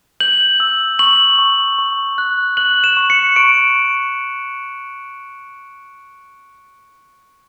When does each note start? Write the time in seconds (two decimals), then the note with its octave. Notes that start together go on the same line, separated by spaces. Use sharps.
0.20 G6 F#7
0.60 E6
0.99 C#6 F#7
1.39 C#6
1.79 C#6
2.18 F#6
2.57 F#6 F#7
2.84 E7
2.97 C#6
3.10 C#7
3.36 C#6 D7